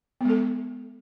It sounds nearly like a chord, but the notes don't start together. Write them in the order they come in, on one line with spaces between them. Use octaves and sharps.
B3 G#3 A4